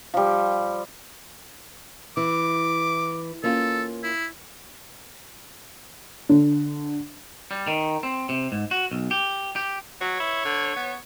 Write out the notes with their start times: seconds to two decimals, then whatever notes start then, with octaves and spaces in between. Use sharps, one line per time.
0.14 F3 G3
2.17 E3 D6
3.44 A#3 C#4 F4 A4
4.03 E4
6.29 D3
7.51 G3
7.67 D#3
8.03 C4
8.29 C3
8.52 G#2
8.71 F#4
8.91 B1
9.11 G4
9.56 G4
10.01 F#3 C#5
10.20 E4
10.45 D3
10.76 B3